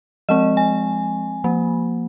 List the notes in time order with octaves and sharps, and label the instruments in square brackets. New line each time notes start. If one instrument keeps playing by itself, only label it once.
[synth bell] F3 G#3 C4 D#5
G#5
F3 A#3